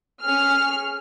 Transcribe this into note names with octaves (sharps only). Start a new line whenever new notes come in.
C#4 G#4 F6